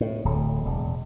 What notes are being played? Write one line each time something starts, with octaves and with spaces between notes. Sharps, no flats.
A2
D1
E1